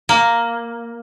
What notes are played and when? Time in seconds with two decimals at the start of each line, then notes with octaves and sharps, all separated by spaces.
0.09 A#3